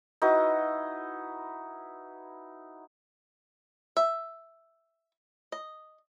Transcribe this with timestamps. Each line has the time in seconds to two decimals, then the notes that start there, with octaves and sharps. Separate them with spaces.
0.22 D#4 E4 F#4 B4
3.97 E5
5.52 D#5